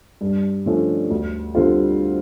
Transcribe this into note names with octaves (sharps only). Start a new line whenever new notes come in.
G2
D3 F3 A3 C#4
D2
D3 G3 C4 F4